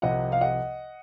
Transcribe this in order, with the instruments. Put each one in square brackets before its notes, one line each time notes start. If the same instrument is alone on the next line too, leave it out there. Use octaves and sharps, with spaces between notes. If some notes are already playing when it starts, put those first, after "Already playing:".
[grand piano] C2 C3 F3 [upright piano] D#5 F#5
[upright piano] F5
D#5 F#5